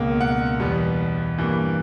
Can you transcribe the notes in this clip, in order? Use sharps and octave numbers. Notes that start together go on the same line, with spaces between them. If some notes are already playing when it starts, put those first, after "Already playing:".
Already playing: C#2 B2 A#3
F#5
E2 B2 G3 B3
G2 E3 A#3